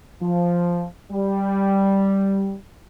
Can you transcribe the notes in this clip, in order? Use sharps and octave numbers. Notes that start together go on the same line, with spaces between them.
F3
G3